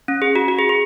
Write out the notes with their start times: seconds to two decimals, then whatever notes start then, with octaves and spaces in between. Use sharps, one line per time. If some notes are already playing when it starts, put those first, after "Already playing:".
0.08 C#4
0.22 G#4
0.36 F#4
0.48 F#4
0.59 G#4
0.69 G#4